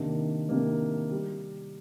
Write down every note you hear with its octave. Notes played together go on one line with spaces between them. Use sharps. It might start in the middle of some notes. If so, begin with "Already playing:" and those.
Already playing: C3 D#3 A#3 D4
C3 D#3 A#3 D4
G3